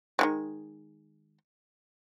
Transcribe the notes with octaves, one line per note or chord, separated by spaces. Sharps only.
D#3 E3 G#3